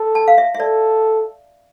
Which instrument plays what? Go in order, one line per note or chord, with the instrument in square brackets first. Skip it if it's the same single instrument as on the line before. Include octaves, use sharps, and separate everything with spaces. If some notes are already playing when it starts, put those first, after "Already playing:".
Already playing: [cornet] A4
[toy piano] A5
F5
E5
E5
[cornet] A4 [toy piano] D5